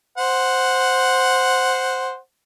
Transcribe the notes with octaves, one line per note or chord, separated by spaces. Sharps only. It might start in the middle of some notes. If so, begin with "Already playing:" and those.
C5 F#5